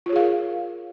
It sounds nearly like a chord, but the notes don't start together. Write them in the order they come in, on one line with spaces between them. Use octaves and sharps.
F4 C#5 G#4 F5 A#4